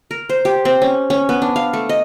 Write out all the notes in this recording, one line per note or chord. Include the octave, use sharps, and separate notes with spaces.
A#4
C5
G4
C4
C#4
C#4
B3
D4
F5
A3
D#5